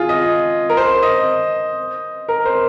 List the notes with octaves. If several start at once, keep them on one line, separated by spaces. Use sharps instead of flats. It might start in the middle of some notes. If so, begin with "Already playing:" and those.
Already playing: F4 G#4
D#5
A#4
C5
D#5
A#4
C5